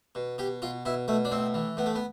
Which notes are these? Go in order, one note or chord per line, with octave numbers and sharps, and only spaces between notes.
B2
B2 G4
B2 F4
B2 E4
B2 A3
D4
A2 C4
E3
A2 B3
A3
B3